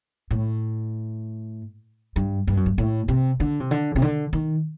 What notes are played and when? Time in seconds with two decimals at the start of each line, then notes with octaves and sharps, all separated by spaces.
0.31 A2
2.16 G2
2.48 G2
2.57 F#2
2.66 G2
2.78 A2
3.08 C3
3.40 D3
3.60 C3
3.71 D3
3.96 C3
4.02 D3
4.33 D#3